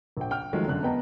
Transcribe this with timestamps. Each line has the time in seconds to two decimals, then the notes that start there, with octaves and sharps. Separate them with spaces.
0.17 A#1 G5
0.31 G5 F6
0.53 D#3 F3 F#3 G#3 A3
0.67 F1 F#2 D3 F#6
0.83 B3 B4 D#5 G5 A5 A#5